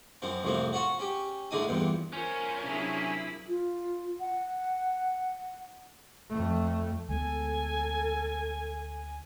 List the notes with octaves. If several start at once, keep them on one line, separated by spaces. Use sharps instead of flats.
F#2 F3 C4
C2 F2 A2 F3 A#3 C4
F4 F#4 C#5 F#5
C#4 G4
A2 D3 G#3 D4 D#4 D#6
E2 G2 A#2
B1 C#4 F4 A#4 C5
C3 F#3 D4 E4 G#4
F4
F#5
F2 A3
D2 G#3 B3 A4 G#5